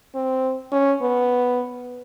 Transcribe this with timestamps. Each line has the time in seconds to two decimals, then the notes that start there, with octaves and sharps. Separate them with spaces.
0.15 C4
0.72 C#4
1.02 B3